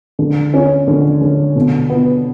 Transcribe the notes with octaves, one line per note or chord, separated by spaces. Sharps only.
D3
C#4
D3
D3
B2
B3